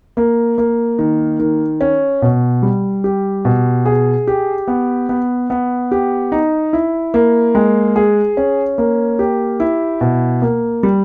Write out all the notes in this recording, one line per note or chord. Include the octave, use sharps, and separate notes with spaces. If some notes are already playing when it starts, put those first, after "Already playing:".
A#3
A#3
D#3
D#3
C#4
B2
G3
G4
B2
G#4
G4
B3
B3
B3
G4
D#4
E4
A#3
G#3
G#4
C#4
A#3
G4
E4
B2
A#3
G3